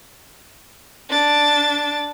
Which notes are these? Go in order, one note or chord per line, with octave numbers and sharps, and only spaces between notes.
D4 A6